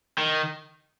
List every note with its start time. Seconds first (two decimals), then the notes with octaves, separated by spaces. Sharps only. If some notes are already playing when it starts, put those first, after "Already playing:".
0.18 D#3